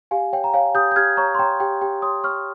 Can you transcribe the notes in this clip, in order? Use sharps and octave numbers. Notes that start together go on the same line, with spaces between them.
G4 F5 G#5
C#5 G5
A#5
C#5 F5 G#5
G4 D#6 G6
G6
G4 F6 G#6
C#5 A#5 C#6
C6
C#5 G5 A#5
G4 G5
G4 G5
C#5 C6 D#6
C#5 C#6 F6